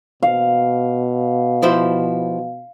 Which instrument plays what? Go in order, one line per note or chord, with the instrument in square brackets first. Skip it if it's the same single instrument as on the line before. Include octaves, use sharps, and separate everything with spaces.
[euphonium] B2 [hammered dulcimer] F5
[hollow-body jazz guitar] F3 E4 C5